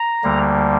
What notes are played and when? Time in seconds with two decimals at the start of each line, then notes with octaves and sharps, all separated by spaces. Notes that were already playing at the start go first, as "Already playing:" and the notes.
Already playing: A#5
0.24 D2 D3 G3 A#3